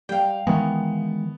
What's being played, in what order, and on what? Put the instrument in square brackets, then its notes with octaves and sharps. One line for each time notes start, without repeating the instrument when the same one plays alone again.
[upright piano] G3 [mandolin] F5 G5
[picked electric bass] D#3 E3 G#3 [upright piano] B3